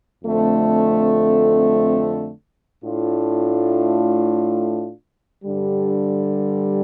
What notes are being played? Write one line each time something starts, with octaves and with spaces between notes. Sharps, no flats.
F2 D3 A3 C4
A2 A3 D4 F4
G2 D3 G3